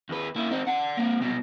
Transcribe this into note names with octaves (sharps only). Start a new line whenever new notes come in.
D#2 B4
A#3 E4
C4 D#4
D5 F#5
A#3 C4
C2 B2